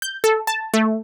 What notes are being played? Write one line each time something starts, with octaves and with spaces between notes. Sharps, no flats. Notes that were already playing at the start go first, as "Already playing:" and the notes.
G6
A4
A5
A3